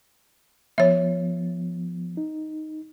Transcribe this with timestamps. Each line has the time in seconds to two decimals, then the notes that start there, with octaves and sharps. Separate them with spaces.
0.78 F3 B3 C#5 E5
2.17 D#4